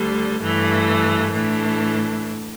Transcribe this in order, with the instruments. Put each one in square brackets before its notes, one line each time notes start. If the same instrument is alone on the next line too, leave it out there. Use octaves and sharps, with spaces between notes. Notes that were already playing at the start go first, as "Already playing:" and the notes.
Already playing: [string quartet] D2 D3 G3
G2 E3 A3
A2 E3 A3 D4